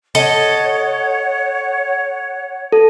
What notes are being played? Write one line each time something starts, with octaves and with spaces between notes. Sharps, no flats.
A4 C#5 D#5 F#5
A4